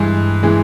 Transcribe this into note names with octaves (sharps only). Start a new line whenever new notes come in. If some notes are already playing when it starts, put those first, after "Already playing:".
Already playing: G2 E3 G#3
E3 G#3